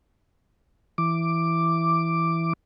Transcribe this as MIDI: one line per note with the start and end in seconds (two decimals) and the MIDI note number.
0.98 2.53 52
0.98 2.53 86